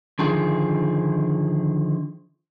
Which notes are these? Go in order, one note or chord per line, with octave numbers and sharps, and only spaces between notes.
D3 D#3 F3 G#4